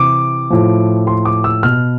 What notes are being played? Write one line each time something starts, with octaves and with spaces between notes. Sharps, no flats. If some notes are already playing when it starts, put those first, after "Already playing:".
Already playing: C3 E3 D6
A2 F3
C6
D6
E6
B2 F6